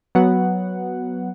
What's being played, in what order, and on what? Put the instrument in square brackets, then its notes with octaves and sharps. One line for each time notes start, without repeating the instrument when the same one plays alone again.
[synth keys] F#3 B3 F#5